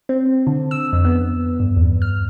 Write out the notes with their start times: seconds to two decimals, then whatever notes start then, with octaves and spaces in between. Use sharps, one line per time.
0.09 C4
0.47 D3
0.71 E6
0.93 F2
1.05 B3
1.60 G2
1.77 E2
2.02 F6